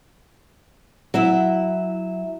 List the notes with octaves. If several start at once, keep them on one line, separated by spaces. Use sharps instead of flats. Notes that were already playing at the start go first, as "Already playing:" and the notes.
F#3 E4 E5